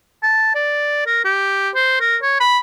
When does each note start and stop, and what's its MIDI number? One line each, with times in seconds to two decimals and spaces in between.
0.23 0.54 81
0.55 1.05 74
1.06 1.21 70
1.25 1.70 67
1.75 1.97 72
2.00 2.17 70
2.22 2.39 73
2.40 2.59 83